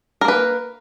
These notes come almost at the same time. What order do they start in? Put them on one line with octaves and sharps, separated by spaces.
A#4 A#3 B4